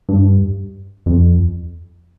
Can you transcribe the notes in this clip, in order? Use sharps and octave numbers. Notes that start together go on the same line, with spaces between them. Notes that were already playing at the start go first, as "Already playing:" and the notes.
G2
F2